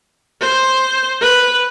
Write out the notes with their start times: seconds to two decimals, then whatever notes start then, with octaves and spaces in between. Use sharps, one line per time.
0.41 C5
1.21 B4